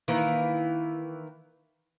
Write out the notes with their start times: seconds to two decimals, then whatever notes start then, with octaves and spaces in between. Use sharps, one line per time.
0.08 D#3 E3 A#3